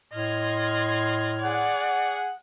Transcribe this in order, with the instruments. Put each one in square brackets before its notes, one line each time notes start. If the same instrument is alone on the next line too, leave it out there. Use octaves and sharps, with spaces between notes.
[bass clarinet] A2 [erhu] D#5 [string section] C6 F6 G#6
[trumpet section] G#4 F#5 [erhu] D5